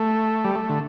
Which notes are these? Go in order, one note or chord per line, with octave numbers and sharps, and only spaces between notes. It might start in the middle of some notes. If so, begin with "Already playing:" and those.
Already playing: A3
G3
A3
D3